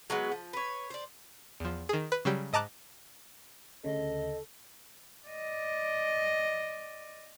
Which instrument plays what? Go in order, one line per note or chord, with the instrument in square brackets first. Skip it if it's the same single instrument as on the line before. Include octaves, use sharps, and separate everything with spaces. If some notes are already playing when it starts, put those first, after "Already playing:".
[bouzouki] F#3 G#3 B3
F3
B4 C#5
C5 D5
[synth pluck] E2 F3
D#3 G#4
B4
C#3 F#3 G3 G4
G#2 D#5 A5 A#5 D6 F#6
[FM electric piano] D2 C#3 [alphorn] A4 [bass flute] D#5
[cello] D5 D#5